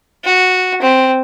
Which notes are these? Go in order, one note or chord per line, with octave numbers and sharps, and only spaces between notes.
F#4
C4